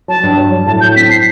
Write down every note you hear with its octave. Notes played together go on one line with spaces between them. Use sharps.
F#3 A5
G2
F#3
F#3
A2 A5
F#3 G6
C4 B6
C7